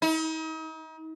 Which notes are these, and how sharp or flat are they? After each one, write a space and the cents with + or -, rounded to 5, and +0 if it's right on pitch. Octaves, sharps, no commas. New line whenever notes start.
D#4 +40